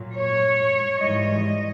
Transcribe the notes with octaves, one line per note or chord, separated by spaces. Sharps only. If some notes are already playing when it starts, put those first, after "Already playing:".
Already playing: A#2 F#3
C#5
G#2 E3 G3 D#5